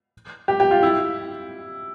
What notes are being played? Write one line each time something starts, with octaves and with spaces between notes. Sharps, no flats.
G4
G4
F4
E4